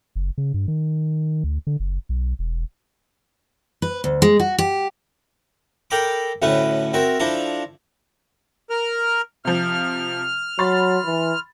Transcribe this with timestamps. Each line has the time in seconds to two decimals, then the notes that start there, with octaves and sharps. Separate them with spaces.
0.16 F#1
0.38 C#3
0.54 G2
0.68 D#3
1.44 D2
1.67 D3
1.80 F#1
2.09 B1
2.39 E1
3.82 B4
4.04 D2
4.22 G#3
4.40 F#4
4.58 G4
5.91 A4 A#4 G5 A#5 B5 D6
6.42 D2 A2 A3 C#4 B4
6.93 C4 F#4 A#4 E5
7.19 F3 D4 E4 A4 A#5
8.70 A#4 F6
9.45 C3 F3 F6
10.59 F#3 B5 C6 A6
11.06 E3